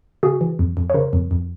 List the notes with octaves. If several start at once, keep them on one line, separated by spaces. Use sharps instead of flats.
C#3 F#4 G#4
E3
F2
F2
C#5
C#3 A#4 C5
F2
F2